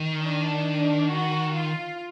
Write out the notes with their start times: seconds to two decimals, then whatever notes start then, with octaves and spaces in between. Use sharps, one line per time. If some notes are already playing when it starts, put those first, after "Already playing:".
Already playing: D#3
0.22 D4
1.10 F#4
1.53 F4